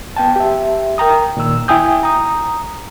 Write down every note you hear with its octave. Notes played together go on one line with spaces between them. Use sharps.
B3 G5 A5
G4 E5
A#4 G5 A#5 D#6
A#2 D#3 E6
E4 G5 G#5 D#6 G6
A#5 D#6